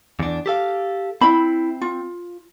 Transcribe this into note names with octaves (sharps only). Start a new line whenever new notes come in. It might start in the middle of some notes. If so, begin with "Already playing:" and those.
E2 D4
G4 A4 F5
C4 E4 B5
F4